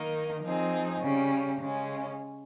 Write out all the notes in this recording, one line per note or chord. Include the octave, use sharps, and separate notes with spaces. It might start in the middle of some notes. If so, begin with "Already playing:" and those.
Already playing: D#3 A#3 D#4
F3 C4 D#4 G#4
C#3 G3 C#4
C#3 G#3 C#4